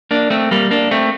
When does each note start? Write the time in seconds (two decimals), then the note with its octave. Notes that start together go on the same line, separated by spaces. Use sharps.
0.11 A#3 D4
0.30 A3 C4
0.51 G3 A#3
0.71 A#3 D4
0.91 A3 C4